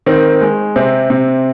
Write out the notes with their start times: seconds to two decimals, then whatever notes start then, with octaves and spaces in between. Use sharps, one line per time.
0.06 D#3 C4
0.41 G#3
0.76 C3 C4
1.10 C3